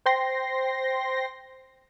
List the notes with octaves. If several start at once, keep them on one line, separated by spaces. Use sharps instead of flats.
C5 G5 C6 A#6